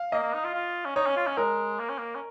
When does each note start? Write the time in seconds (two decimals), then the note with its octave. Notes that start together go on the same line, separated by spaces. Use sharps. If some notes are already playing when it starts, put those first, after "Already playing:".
Already playing: F5
0.12 A#3 D#5
0.23 A#3
0.33 D#4
0.44 F4
0.54 F4
0.85 C#4
0.96 D#4 C#5
1.06 C#4
1.16 F4
1.27 C#4
1.37 G#3 A#4
1.79 A#3
1.89 C#4
1.98 A#3
2.15 C#4